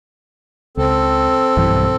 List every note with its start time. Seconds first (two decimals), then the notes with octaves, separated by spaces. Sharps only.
0.77 C#2 C4 A4
1.57 B1 G2 E3